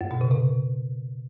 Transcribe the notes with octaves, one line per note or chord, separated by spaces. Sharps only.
F#2
B2
C#3
C3